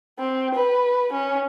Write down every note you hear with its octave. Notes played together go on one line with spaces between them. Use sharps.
C4
B4
C#4